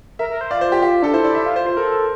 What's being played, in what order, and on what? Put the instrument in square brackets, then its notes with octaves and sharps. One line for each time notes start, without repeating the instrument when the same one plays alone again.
[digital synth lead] A#4 [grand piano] E5
[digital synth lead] A#4
C5
[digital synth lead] F4 [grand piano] D5
[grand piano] C5
G4
G4
[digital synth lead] D4 [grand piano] A4
[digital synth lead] E4 [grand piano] C5
[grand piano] D5
E5
[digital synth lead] F4
[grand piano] C5
C5
[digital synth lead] A4 [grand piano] A#4